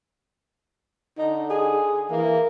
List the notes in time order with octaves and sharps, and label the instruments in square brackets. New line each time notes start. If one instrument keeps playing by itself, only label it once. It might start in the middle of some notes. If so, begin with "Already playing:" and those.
[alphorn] D3 [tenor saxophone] D#4
[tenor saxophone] G#4
[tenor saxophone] E3 [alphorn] A#3